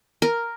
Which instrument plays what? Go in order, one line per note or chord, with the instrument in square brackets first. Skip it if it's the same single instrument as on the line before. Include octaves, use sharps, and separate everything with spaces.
[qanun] A#4